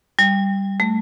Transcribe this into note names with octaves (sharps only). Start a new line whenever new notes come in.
G3
A3